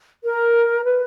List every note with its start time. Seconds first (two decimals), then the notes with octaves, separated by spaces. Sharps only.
0.24 A#4
0.84 B4